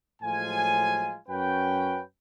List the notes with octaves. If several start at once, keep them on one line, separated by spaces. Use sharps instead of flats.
A2 F3 F#3 G#3 F4 G#5
F#2 C#4 F#4 B4 G5